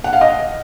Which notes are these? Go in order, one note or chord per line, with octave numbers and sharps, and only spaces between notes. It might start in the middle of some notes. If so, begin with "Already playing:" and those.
F#5
F5
D#5